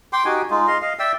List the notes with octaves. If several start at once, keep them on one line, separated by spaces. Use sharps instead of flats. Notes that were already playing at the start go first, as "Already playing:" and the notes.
G5 C6 D6
D#4 F#4 G4 G#5
G#3 D#4 F4
D#5 F5 C6
D#5 F5
D5 E5 G5 E6